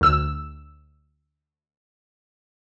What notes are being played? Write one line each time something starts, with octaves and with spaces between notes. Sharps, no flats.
D2 E6